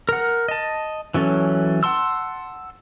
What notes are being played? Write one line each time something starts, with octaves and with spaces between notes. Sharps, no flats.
A#4 F#5
D#5 A5
E3 F#3 C#4 A4
F#5 A5 C6 E6